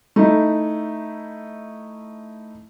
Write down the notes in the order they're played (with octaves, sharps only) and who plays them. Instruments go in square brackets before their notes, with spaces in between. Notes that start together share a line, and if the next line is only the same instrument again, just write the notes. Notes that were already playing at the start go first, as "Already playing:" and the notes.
[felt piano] A3 D#4 E4